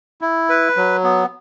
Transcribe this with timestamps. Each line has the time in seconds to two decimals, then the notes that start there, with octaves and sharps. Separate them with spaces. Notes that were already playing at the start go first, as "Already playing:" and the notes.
0.21 E4
0.49 B4
0.76 F#3
1.04 B3